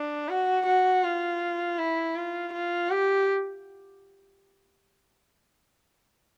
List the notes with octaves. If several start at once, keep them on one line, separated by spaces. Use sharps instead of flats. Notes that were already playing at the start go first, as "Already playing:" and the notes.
Already playing: D4
F#4
F#4
F4
E4
F4
F4
G4